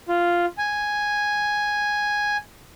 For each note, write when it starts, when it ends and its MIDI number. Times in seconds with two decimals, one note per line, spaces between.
0.08 0.45 65
0.58 2.37 80